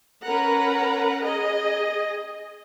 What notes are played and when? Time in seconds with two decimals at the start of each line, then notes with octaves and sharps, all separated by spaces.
0.23 C#4 A#4 B4 F#5 A#5
1.23 G#4 D#5